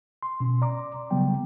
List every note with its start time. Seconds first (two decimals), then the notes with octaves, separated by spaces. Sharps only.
0.23 C6
0.40 B2 C#4
0.62 D5 A#5 C6 D6
1.11 C#3 F#3 G3 B3 G5